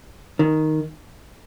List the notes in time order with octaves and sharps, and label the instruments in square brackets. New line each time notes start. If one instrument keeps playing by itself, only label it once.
[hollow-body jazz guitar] D#3